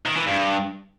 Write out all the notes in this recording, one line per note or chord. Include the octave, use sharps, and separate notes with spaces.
D#3
E3
G2